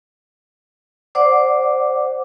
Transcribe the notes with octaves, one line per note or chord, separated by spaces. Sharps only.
C5 D5 F#5 D6